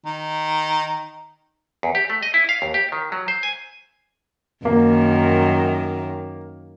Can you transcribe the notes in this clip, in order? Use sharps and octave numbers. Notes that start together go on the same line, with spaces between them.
D#3
E2
G4
A3
D#5
E4
F5
D#2
G4
D#3
F#3
C5
G#5
F#2 D#3 A#3